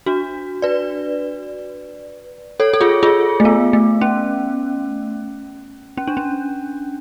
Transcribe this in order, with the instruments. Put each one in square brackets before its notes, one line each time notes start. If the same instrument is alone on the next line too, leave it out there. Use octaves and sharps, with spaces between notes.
[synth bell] D4 F#4
B4 D5
A4 C#5
A4
F4 G#4
F4 G#4
A3
B3
A3
C#4
C#4
D4
C#4